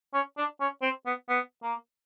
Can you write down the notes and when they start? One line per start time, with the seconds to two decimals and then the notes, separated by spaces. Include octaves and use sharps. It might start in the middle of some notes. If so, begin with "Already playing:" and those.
0.14 C#4
0.38 D4
0.60 C#4
0.82 C4
1.06 B3
1.29 B3
1.63 A#3